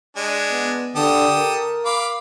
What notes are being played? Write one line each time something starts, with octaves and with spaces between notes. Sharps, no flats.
G#3 D4
B3
D3 G4 A4 D#6
A#4
F5 B5 D6